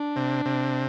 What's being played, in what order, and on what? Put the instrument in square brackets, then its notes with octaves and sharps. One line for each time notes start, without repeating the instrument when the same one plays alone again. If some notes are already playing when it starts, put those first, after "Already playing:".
Already playing: [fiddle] D4
[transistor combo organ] C3
C3